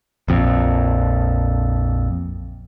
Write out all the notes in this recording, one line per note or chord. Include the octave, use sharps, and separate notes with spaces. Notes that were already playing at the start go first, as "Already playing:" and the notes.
A#1 F2